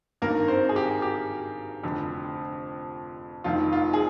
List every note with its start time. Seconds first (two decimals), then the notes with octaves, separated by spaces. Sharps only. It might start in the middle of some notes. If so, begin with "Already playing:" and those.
0.22 G#1 G2 D#3 A#3 A#4
0.48 C4 C5
0.69 G#4
0.76 G4
1.02 G4
1.83 F1 F2 D3
3.44 F1 F2 D#3 F4
3.73 F4
3.93 G#4